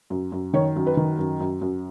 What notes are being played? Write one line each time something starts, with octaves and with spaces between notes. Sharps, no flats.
F#2
F#2
D#3 C#5
F#2
B4
D#3
F#2
F#2
F#2